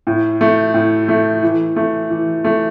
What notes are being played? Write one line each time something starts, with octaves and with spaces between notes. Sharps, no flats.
A2
A3
A2
A3
E3
A3
E3
A3